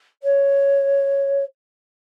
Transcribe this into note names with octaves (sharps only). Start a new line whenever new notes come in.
C#5